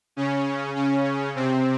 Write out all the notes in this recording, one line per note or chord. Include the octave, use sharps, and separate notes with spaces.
C#3 C#4
C#3 C#4
C3 C4